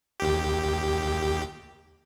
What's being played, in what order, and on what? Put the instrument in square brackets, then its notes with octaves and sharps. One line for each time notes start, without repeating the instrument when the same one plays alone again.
[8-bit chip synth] D#2 G4